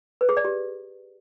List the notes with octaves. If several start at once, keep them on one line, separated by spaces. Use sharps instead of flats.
B4
G#4
D5
G4